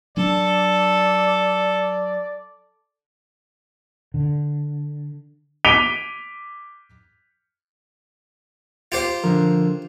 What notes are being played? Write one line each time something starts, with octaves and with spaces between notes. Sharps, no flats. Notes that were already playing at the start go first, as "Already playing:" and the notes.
F#3 D4 A4 D5
D3
D6 B6 D7 D#7 F7 G7
F4 G4 C5
D3 F3 A#4